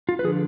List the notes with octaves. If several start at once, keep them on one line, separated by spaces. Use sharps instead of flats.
F4
B4
D3 F3 G#4